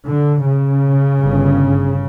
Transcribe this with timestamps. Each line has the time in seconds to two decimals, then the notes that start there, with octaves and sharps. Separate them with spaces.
0.09 D3
0.46 C#3
1.21 G1 G2